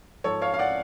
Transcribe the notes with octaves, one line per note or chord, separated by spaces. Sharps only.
G#2 F3 A4 C#5
C#5 F5
F5
D5 F#5